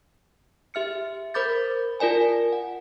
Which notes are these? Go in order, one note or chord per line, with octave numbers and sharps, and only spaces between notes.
G4 E5 F6 C#7
A#4 C5 B5 D6 G6 A6
F4 A#4 D5 G#5 A5
F#5